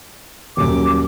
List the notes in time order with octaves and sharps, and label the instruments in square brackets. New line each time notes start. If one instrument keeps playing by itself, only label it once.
[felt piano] D#1 F#2 [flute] D6